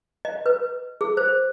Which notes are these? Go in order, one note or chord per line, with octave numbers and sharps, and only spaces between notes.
D#5
B4
G#4
C5